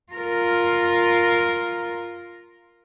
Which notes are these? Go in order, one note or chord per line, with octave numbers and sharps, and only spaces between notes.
F4 A#4